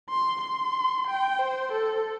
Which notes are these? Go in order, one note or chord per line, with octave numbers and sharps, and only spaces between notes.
C6
C6
G5
C5
A4